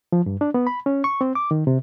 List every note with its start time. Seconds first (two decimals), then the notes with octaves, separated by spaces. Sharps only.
0.12 F3
0.26 G2
0.41 D4
0.54 B3
0.67 B5
0.86 C#4
1.04 C#6
1.21 C4
1.35 D6
1.51 D#3
1.67 C3